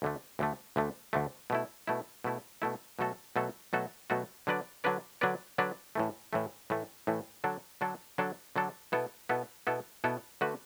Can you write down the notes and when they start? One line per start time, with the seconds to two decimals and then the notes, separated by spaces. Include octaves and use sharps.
0.02 D2 D3 A3
0.39 D2 D3 A3
0.76 D2 D3 A3
1.13 D2 D3 A3
1.50 B2 A3 E4
1.87 B2 A3 E4
2.24 B2 A3 E4
2.62 B2 A3 E4
2.99 B2 F#3 A3 F#4 A4
3.36 B2 F#3 A3 F#4 A4
3.73 B2 F#3 A3 F#4 A4
4.10 B2 F#3 A3 F#4 A4
4.47 D3 F#3 D4 B4 D5
4.84 D3 F#3 D4 B4 D5
5.21 D3 F#3 D4 B4 D5
5.58 D3 F#3 D4 B4 D5
5.95 A2 E3 A3
6.33 A2 E3 A3
6.70 A2 E3 A3
7.07 A2 E3 A3
7.44 D3 F#3 D4 A4
7.81 D3 F#3 D4 A4
8.18 D3 F#3 D4 A4
8.56 D3 F#3 D4 A4
8.92 B2 B3 E4 A4
9.29 B2 B3 E4 A4
9.67 B2 B3 E4 A4
10.04 B2 B3 E4 A4
10.41 D3 A3 F#4 B4